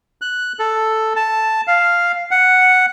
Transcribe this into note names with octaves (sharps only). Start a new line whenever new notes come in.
F#6
A4
A5
F5
F#5